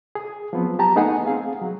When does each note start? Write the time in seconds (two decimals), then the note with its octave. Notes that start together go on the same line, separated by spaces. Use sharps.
0.15 G#4
0.53 F3 F#3 B3 C4
0.79 G4 A5 A#5
0.96 A3 B3 D#4 G#4 F#5 G#5
1.26 C4 G#4 F5
1.61 F#3